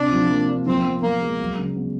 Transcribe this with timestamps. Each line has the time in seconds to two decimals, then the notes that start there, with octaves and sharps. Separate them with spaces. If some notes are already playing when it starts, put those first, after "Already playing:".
Already playing: C3 D4
0.13 F3
0.30 A#3
0.48 A#3
0.67 F3 C4
0.85 B3
1.02 F3 A#3
1.22 G#3
1.39 F#3
1.58 C#3
1.76 B3